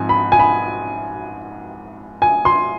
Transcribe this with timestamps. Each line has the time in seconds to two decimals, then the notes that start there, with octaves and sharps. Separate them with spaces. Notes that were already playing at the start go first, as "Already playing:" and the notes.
Already playing: G#2 F3 C4 G#5
0.09 B5
0.32 G#5
0.39 B5
2.22 G#5
2.45 C6